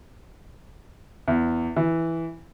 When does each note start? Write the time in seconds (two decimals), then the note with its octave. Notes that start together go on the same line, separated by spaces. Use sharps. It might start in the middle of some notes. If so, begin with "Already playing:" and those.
1.28 E2
1.76 E3